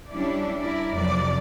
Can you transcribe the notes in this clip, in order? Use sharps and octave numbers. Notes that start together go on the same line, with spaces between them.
G3 C#4 D4 E4 D5
E4 A#4 D5
F2 C3 F#3 D5